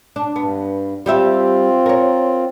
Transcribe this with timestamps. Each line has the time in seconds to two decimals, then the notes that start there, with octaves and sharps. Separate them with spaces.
0.16 D4
0.36 G2 B3
1.06 G3 C4 F4 G4 E5
1.86 A#4 C#5